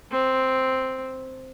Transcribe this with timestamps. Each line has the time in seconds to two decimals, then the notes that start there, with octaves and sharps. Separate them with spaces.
0.11 C4